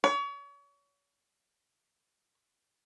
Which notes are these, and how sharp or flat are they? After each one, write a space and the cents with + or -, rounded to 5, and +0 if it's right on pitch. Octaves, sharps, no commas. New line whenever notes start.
C#5 +35